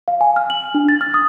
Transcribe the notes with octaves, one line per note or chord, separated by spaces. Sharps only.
F5
G#5
F6
F#7
D4
A6
F6
D#6